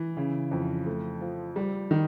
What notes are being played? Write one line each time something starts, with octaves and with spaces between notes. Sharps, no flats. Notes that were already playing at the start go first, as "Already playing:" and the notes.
Already playing: E3
C#3
F2
A3
F3
G3
D#3